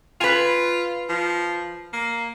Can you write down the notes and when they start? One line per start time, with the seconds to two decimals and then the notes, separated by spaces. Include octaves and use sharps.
0.21 F4 B4 G#5
1.09 F3
1.93 A#3